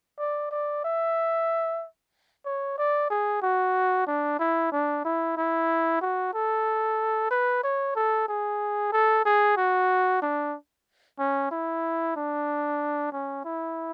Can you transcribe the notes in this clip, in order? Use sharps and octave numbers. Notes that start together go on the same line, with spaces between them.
D5
D5
E5
C#5
D5
G#4
F#4
D4
E4
D4
E4
E4
F#4
A4
B4
C#5
A4
G#4
A4
G#4
F#4
D4
C#4
E4
D4
C#4
E4